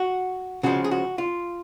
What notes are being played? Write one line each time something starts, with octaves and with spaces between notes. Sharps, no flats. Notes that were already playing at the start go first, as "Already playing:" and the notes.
Already playing: F#4
C#3 F3 G#3 F#4
G#4
F#4
F4